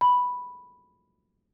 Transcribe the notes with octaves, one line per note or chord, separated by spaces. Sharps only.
B5